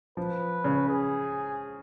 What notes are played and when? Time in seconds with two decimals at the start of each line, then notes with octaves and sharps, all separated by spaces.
0.17 F3 B4
0.64 C#3
0.88 G#4